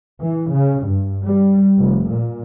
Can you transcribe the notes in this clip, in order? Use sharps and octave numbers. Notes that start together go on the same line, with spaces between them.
E3
C#3
G2
G3
F1
A#2